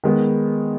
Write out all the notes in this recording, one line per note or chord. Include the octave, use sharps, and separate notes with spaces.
D#3 G#3 B3